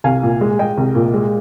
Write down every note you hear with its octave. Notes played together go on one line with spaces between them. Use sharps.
C2 F5 G#5
A#2
G#3
G#3 D#5 G5
C2
A#2
G#3